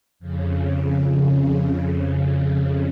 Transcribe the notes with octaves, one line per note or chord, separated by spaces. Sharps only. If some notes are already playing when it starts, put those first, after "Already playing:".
F2 C#3